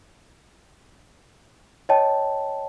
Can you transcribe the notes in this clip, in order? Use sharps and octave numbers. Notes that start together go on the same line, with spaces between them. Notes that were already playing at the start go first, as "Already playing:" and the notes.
C#5 D#5 G5 A5